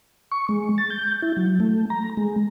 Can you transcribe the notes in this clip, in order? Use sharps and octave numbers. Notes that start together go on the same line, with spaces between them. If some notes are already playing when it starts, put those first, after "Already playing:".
C#6
G#3
A6
G6
E4
F#3
A3
A#5
G#3